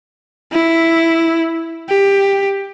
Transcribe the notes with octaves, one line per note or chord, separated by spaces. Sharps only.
E4
G4